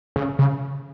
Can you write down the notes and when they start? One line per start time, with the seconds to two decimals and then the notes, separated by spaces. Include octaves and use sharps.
0.16 C#3
0.39 C#3